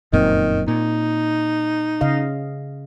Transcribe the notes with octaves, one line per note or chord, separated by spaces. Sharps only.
F1 F#2 A#2 D#3 C4
A#2 D#4
C#3 D#5 F5